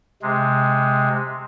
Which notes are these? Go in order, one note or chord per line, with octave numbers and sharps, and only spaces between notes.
C3 G#3